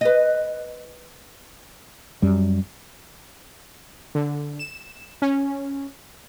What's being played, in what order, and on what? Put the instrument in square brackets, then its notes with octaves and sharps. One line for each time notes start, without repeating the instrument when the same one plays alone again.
[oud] B4 D#5
[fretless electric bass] F#2 G3
[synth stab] D3
E7
C#4